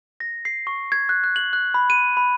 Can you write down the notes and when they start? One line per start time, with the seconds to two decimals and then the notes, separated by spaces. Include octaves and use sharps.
0.20 A#6
0.45 C7
0.67 C#6
0.92 G#6
1.09 F#6
1.24 F#6
1.36 F#7
1.53 F#6
1.74 B5
1.90 D#7
2.17 B5